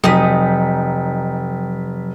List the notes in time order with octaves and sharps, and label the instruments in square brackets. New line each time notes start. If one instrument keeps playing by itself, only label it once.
[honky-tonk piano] F1 [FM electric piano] F#3 B6 [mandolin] D#4 D#6 [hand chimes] G5